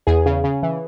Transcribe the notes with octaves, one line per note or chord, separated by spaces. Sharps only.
E2 G#4
C#3
C#3
E3